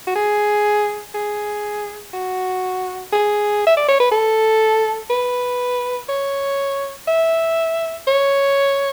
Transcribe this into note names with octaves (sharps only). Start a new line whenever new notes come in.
F#4
G#4
G#4
F#4
G#4
E5
D5
C#5
B4
A4
B4
C#5
E5
C#5